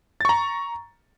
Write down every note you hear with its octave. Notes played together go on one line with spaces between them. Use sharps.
A#5 C#6 A6